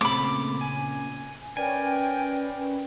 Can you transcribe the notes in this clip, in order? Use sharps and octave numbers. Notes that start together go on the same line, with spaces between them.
A#2 C#3 A3 C4 B5 D6
G#5
C#4 A#4 B4 D5 G5 G#5